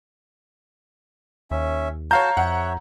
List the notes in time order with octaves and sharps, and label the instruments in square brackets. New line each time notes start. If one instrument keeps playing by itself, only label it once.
[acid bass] D#2 [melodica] C#4 E5
[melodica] F#4 A5 [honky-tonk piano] C#5 F5 G6 [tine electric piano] A#5
[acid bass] F2 [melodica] C#5 E5 [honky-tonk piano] F#5